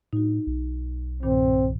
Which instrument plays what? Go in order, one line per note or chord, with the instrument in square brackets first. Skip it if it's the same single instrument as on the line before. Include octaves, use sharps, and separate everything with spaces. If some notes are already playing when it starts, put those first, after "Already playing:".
[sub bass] A2 [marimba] D#4 F#4
[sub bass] B1
[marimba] G2 A#2 D#3 [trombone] C4